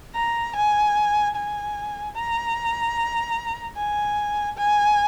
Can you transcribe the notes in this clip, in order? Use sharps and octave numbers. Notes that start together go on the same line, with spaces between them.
A#5
G#5
G#5
A#5
G#5
G#5